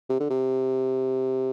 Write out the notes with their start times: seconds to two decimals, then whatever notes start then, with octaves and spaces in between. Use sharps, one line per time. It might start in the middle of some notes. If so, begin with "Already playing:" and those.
0.10 C3
0.20 D3
0.30 C3